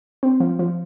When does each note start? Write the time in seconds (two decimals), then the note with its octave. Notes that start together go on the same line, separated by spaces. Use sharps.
0.23 C4
0.40 F3
0.59 F3